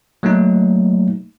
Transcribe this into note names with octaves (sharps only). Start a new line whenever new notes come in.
F#3 A3 A#3 D#4